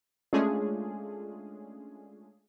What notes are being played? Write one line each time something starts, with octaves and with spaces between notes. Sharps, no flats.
G#3 A3 C#4 D4 F4 G#4